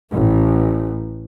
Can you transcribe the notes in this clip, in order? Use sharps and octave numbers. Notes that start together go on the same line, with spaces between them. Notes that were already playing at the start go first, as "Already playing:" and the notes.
A1